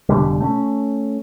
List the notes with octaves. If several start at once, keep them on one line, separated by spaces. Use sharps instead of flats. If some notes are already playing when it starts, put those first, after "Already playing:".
F1 B2 D3 G3
A3 C4 C#4